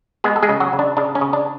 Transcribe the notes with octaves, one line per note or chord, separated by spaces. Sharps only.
G#3 B3 G#4
A4
G#3 G#4
C#3
F#3 F#4
C#3
D4
C#3 D4
C#4
C#3
D4